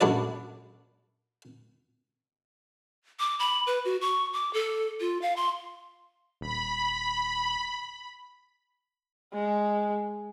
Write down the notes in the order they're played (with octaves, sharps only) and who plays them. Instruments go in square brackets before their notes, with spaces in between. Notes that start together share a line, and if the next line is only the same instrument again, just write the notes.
[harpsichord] A#1 F#2 D4 E4 D5
[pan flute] D6
B5
B4
F#4
C#6
D6
A4
F4
F5
C6
[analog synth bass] D#1 [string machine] B5
[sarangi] G#3